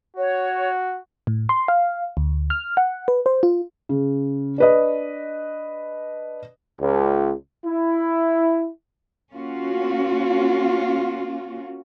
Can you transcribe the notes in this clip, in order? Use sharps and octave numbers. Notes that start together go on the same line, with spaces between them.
F#4 C#5
A2
C6
F5
D2
F6
F#5
B4
C5
F4
C#3
D4 B4 D#5
C#2
E4
A#3 C#4 F4 F#4